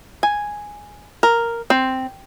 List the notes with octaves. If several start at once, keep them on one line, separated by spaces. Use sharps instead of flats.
G#5
A#4
C4